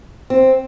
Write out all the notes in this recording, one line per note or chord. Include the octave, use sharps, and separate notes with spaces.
C4